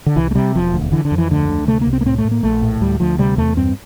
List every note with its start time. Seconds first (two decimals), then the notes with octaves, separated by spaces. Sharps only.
0.06 D3
0.16 C2 E3
0.31 A3
0.35 C3 G3
0.55 E1 F3
0.73 D2
0.92 D3 E3
1.05 D3
1.11 F2
1.18 E3
1.31 D2 D3
1.49 D2
1.67 C3 A3
1.81 A#3
1.87 C2
1.93 C4
2.01 A#3
2.06 A2 C4
2.18 A3
2.25 A2
2.31 A#3
2.43 A#1 A3
2.62 A2
2.81 D2 G3
3.00 D2 F3
3.19 C3 G3
3.38 E2 A3
3.57 G2 C4